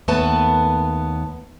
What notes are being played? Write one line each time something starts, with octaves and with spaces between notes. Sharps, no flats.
D#2 A3 B3 B4 A5